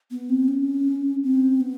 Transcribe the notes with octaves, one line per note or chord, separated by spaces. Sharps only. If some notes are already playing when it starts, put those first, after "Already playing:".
B3
C4
C#4
C4
B3